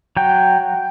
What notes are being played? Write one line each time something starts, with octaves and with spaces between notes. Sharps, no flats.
F#3 G5